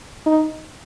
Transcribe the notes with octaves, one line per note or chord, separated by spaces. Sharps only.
D#4